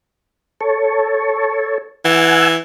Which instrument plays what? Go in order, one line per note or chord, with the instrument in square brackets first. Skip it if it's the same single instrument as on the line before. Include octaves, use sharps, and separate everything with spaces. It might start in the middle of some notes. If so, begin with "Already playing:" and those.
[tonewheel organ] A4 C#5
[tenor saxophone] E3 [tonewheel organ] F#5 G#5 E6